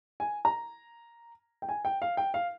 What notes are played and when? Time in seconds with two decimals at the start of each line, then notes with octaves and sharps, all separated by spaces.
0.20 G#5
0.45 A#5
1.62 G5
1.69 G#5
1.85 G5
2.02 F5
2.17 G5
2.34 F5